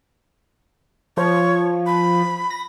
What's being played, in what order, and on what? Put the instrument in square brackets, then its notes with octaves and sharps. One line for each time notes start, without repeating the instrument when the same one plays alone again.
[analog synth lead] F3 [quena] C#5
[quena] B5
[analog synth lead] A#6